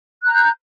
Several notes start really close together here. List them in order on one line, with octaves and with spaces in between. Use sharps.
F#6 A#5 G6